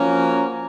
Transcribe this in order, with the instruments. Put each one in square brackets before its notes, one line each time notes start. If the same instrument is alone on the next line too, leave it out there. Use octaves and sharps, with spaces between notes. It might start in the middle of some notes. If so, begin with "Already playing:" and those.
Already playing: [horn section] F3 A#3 C#4 F#4 A#4